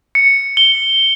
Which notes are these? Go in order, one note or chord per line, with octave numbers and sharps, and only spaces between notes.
C#7
G7